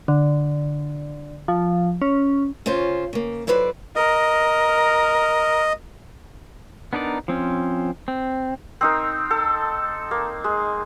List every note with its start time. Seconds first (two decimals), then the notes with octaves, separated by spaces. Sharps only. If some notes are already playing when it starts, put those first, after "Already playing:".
0.08 D3
1.48 F3
2.02 C#4
2.66 C#3 C#4 F4 C5
3.13 C#3 A#3
3.47 F#3 E4 A4 B4 C5 D5
3.96 A#4 D#5
6.93 B3 D4 D#4 A#4 D5
7.28 F3 C4 C#4
8.08 C4
8.81 C4 D#4 A#4
9.31 A4
10.11 A#3
10.44 G#3